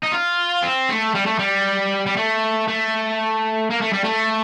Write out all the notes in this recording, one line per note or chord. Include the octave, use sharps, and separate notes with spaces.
D#4
F4
C4
A3
G3
A3
G3
G3
A3
A3
A#3
A3
G3
A3